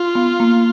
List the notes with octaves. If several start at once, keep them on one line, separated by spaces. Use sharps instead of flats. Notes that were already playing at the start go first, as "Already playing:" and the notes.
Already playing: F4
B3
A#3